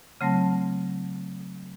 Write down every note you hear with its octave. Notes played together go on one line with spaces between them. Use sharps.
C#3 F#3 A3 C4 A5 A#6